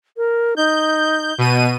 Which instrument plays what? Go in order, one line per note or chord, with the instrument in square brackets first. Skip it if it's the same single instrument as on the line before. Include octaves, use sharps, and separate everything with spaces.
[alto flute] A#4
[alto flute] D#4 [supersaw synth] G6
[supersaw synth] B2 D#7